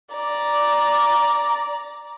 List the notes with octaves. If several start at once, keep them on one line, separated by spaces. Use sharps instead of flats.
D5 A#5